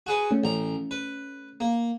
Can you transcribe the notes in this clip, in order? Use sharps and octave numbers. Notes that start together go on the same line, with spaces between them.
F#4 G#4 B4
A3 C#4
A1 A#5
B4
A#3